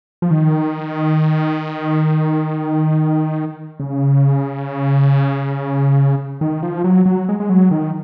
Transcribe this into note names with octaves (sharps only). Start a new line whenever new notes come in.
F3
D#3
C#3
D#3
F3
F#3
F#3
G#3
G#3
F#3
D#3